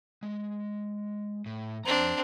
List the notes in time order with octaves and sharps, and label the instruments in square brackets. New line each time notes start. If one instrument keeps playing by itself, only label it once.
[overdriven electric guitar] G#3
A2
[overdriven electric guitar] F2 A#5 [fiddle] C4 D4